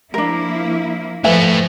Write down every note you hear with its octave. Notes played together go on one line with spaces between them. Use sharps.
F3 A#3 D4 E4 A#4
A2 F3 A3 B4 E5 G#5